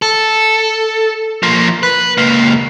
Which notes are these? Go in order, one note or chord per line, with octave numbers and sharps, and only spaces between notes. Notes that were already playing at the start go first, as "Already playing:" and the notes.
A4
F3 A#3
B4
C#2 A#3